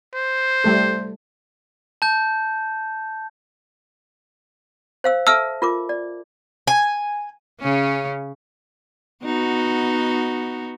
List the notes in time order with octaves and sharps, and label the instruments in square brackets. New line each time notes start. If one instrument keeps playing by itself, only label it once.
[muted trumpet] C5
[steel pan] G3 A3 A4
[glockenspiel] A5 G6
[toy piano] C5 F5 E6
[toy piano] A4 E5 A5 [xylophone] E6 F6
[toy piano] F4 A#4 D6
D5
[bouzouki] G#5
[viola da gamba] C#3 C#4
B3 D#4 F#4